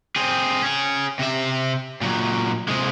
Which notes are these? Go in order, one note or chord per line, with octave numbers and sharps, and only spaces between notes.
C4 G#4
C#4 G#4
C3 E5
A#2 F#3
C3 G#3